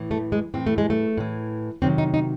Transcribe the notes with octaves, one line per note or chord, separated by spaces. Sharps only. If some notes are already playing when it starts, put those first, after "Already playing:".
Already playing: A2 E3
A3
G#3
A2 E3 C4
A3
G#3
A3
A2 E3
C3 D#3 F#3 C4
D#4
D#4